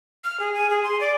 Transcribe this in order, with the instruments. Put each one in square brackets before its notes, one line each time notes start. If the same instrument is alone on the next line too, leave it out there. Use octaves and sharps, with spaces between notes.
[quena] F6
G#4
G#5
G#4
C6
D5